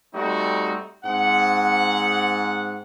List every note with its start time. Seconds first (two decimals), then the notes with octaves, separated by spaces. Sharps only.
0.15 G3 A3 C4 D#4 F#4
1.05 G#2 C4 F#5